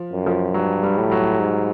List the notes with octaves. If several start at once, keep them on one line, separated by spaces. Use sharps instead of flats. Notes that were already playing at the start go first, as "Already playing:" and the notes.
Already playing: F3
F#2
F3
G2 F#3
G3
A2
F#3
G#2